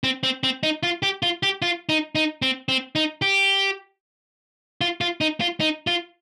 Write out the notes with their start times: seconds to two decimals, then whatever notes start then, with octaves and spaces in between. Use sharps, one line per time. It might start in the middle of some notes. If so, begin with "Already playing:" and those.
0.04 C4
0.23 C4
0.43 C4
0.63 D#4
0.83 F4
1.03 G4
1.23 F4
1.43 G4
1.62 F4
1.89 D#4
2.15 D#4
2.42 C4
2.69 C4
2.95 D#4
3.22 G4
4.81 F4
5.01 F4
5.21 D#4
5.41 F4
5.60 D#4
5.87 F4